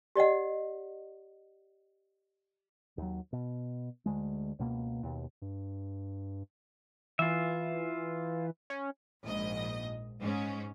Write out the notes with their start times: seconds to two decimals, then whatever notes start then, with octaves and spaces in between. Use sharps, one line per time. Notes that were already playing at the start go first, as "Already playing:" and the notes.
0.15 G4 D5 D#5 F#5
2.98 D#2 F#3
3.33 B2
4.06 D2 G#3
4.59 C#2 B2 A#3
5.03 D#2 B2
5.42 G2
7.19 E3 F4 E5
8.70 C#4
9.23 A#1 G#2 D#5
10.21 G#2 C#4